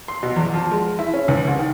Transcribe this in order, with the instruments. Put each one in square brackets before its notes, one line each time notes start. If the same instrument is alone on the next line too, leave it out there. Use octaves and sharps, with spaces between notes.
[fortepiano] C6
B2
E2
F3
G#3
E4
C#4
C#2
C2
D#3